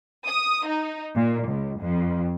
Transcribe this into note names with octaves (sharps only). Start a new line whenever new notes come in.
D#6
D#4
A#2
C#2
F2